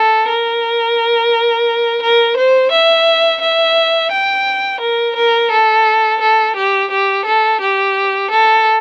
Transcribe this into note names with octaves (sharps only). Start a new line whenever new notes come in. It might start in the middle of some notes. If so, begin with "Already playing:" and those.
Already playing: A4
A#4
A#4
C5
E5
E5
G5
A#4
A#4
A4
A4
G4
G4
A4
G4
A4